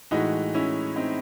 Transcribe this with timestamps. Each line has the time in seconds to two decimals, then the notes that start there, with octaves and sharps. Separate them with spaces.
0.11 A2 E3 G#3 D#4 F#4
0.54 C#4 E4
0.96 C4 D#4